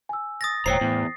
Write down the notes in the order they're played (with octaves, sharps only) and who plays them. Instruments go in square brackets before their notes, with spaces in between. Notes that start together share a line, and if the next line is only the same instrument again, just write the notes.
[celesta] G#5 E6
[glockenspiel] D#6 A6 A#6
[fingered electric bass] E1 A#2 [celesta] C5 G5 [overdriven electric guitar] C#5 A#5 [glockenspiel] C7
[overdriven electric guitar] E2 [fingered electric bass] A2